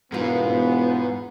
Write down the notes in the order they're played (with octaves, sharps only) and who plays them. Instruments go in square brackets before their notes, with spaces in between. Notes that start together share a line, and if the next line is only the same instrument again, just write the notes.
[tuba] E1 [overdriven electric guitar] G#2 G#3 [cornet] B3 [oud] F4 A#4